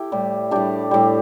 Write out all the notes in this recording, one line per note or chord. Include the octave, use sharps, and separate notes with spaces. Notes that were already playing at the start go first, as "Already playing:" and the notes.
Already playing: E4 G4 A4
A2 G3
A2 G3 D4 G4
A2 G3